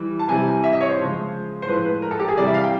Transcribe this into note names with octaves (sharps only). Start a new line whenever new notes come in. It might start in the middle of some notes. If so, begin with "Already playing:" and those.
Already playing: E3 G3
A5
C3 E3 G3 G#5
E5
D#5
C#5
C5
C#3 F3 G#3
C5
A2 F3 G#3 B4
B4
A#4
A4
G4
G#4
C3 E3 G3 D5
E5
F5
G5